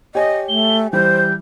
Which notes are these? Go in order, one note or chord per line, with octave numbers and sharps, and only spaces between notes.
G4 C#5 D#5 G#5
A3 G7
E3 G3 C5 G6